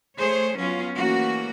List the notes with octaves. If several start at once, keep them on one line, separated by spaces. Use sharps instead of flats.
A3 G#4 C5 C#5
F#3 B3 C#4 F4
E3 A3 A#3 C#4 F#4